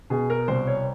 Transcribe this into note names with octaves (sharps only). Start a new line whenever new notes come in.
B2 G#4
A#4
C2 C5
C#5